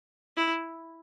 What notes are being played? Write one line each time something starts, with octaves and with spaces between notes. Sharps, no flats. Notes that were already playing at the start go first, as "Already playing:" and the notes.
E4